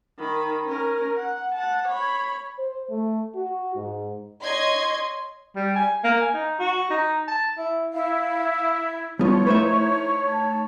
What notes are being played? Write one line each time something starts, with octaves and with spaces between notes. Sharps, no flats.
D#3 B5
C#4 A#4
F#5
F#5 A5
C#5 B5
C5
A3
F#4
G#2
C#5 D#5 C6 G#6
G3
G#5
A#3
G#5
D#4
F#4
D#4
A5
E4
E4 F5
F3 G3 B3 E4 F4 C#5
A3 D#4 B4 C5 E5
A5